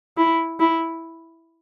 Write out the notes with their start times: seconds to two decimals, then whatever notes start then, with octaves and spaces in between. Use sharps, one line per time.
0.17 E4
0.60 E4